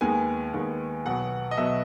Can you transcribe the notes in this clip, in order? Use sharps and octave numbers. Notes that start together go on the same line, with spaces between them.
D#2 D#3 G#3 B3 G#5
D#2 D#3 G#3 B3
B1 B2 F#3 B3 F#5
D#5
B1 B2 F#3 B3 E5